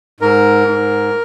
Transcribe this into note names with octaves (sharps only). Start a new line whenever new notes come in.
G#2 A#4
G#2